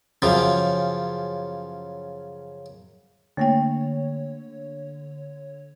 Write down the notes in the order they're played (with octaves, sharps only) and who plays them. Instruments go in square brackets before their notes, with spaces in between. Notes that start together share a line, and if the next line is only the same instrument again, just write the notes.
[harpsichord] F#2 C#3 F3
[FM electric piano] D3 C#5 [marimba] A3 A#3 G5